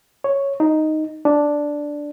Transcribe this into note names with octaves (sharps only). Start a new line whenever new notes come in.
C#5
D#4
D4